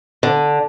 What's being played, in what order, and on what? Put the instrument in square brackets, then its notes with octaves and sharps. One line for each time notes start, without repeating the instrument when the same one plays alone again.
[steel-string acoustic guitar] D3